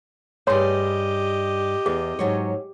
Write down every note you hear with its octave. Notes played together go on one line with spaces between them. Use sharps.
G2 G4 G#4 C#5 D#5 C6
E2 G#4
G#2 F#3 C#5